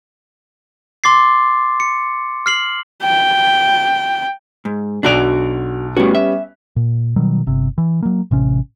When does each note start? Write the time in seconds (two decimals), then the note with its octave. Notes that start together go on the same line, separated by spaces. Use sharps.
1.04 C6 D6 A6 C7
1.80 C#7
2.46 F6 C7 F#7
3.03 G5
4.65 G#2
5.03 B1 D4 F#4 D5 F#6 F7
5.97 A2 G3 B3 C#4 F#4
6.15 E5
6.76 A#2
7.16 B2 D#3 F#3 G3
7.46 G1 C3
7.78 E3
8.03 F#3 A#3
8.31 A1 C3 C#4